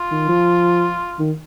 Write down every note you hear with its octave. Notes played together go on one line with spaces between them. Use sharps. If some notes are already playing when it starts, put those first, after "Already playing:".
Already playing: F4
D#3
F3
D#3